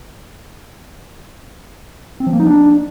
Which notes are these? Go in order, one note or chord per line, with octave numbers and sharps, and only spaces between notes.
C4
F3
A#3
D#4
D4